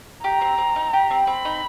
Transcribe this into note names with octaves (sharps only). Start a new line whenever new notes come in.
G4 A#5
C4
C4
D#4
G4
C4
C4 B5
D#4